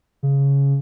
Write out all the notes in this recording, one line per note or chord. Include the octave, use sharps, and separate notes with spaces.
C#3